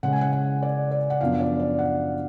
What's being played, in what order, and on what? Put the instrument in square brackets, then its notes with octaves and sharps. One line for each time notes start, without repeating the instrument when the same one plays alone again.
[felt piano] C#3 G#3 C#4 F#5
G#5
F#5
F#5
D5
D5
F#5
F#2 F3 B3 D4 F5
D5
D5
F#5